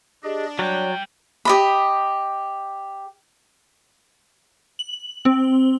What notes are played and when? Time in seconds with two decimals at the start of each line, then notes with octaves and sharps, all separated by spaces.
0.24 D4 G4 G#4 D#5
0.59 F#3 G3 C#5 D5 G5
1.45 G4 D#5 B5
4.79 F#7
5.25 C4